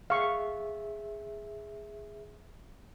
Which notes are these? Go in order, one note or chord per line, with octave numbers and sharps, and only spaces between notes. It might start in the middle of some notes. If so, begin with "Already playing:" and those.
G#4 E5 F5 C#6